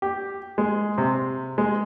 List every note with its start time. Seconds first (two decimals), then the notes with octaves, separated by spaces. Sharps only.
0.02 G4
0.58 G#3
0.98 C3
1.58 G#3